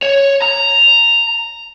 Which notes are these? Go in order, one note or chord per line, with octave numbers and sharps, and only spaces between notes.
C#5
A#5